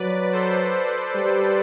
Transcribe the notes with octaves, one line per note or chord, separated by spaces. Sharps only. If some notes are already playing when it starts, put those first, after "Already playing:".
Already playing: F#3 B4 D5
A4 C5
G3